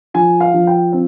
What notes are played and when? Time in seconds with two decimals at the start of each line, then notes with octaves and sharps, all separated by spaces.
0.14 F3 G#5
0.40 F5
0.54 F3
0.67 G5
0.92 C4